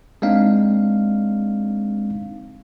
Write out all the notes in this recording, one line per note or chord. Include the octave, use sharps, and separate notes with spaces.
G#3 A#3 C4 D4 D#4 F5